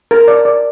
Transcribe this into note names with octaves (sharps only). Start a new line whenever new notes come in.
A#4
D5
D5